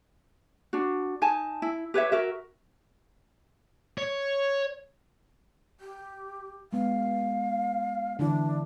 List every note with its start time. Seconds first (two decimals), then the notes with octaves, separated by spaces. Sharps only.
0.73 D4 F#4
1.22 D#4 G#5 A5
1.62 E4
1.94 G4 B4 C#5 E5
2.12 F#4 A#4 E5
3.98 C#5
5.80 G4
6.73 G#3 B3 F5
8.19 D3 E3 D4 E4